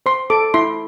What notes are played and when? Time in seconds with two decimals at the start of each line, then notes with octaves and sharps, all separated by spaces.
0.06 C5 C6
0.30 A4 D6
0.54 E4 C6